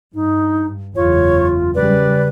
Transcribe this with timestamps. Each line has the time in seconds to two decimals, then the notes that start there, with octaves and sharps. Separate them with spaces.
0.15 G2 D#4
0.96 F#1 E2 F4 C#5
1.75 C#3 G3 B4 D5